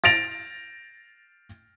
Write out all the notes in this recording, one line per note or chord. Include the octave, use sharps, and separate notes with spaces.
A6 A#6 D7 F7